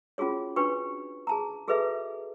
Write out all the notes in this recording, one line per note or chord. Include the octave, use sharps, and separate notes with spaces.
C#4 F4 F#4 G#4 C#5
D4 F#4 B4 G5 C#6
G#4 A5 A#5
F#4 G#4 A4 B4 D#5 E5